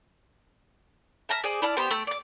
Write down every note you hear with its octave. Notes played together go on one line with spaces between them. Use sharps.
E5 A5 A#5 F6
G#4 C5 D5 G#5
E4 D5 A5 F6
B3 G4 C5 G5
A3 G5 E6
D5 D6